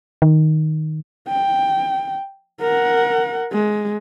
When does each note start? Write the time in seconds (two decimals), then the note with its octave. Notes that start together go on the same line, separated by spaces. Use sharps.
0.22 D#3
1.28 G5
2.61 A#4 F#5
3.52 G#3